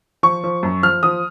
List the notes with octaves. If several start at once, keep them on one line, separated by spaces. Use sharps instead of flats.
F3 C#6
F3
F#2
F3 F6
F3 D#6